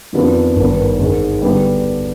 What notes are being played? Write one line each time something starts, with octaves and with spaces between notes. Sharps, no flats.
F2 D#3 B3 D4 F4
G#1 G2 D#3 B3
G#2 D#3 G#3
D3 G3 B3 D4 G4